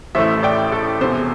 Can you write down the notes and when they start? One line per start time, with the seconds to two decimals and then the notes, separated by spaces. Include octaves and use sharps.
0.15 A1 A2 E3 A3 C5 E5
0.43 D5 G5
0.72 A4
1.01 E1 E2 C3 C5